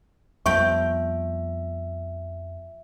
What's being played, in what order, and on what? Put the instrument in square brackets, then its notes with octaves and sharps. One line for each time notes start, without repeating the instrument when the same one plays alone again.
[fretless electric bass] F2 G3 B3 [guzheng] F3 G5 B5 [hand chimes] E5 [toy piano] C#6